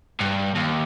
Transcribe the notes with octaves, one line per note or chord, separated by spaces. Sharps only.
G2
D#2